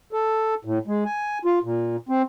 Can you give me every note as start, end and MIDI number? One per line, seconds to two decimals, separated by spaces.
0.12 0.54 69
0.65 0.79 45
0.87 1.04 56
1.05 1.38 80
1.45 1.59 65
1.64 1.96 46
2.09 2.22 60